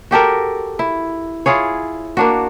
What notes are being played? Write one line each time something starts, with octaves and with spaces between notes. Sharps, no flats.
F#4 G4 A4 A#4
E4
E4 F4 G#4 C#5
A#3 D4 F#4